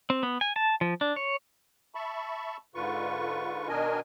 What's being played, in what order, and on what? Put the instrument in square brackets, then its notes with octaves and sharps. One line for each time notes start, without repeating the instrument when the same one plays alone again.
[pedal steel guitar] C4
B3
G#5
A5
F3
D4
C#5
[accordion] E5 A5 B5 C#6
G#2 D3 F4 B4 C#6
B2 D#3 D4 A#4 D#5 G#5